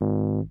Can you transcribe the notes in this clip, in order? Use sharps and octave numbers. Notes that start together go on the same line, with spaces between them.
G#1